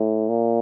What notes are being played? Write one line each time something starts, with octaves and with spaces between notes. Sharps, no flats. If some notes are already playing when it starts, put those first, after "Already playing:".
Already playing: A2
A#2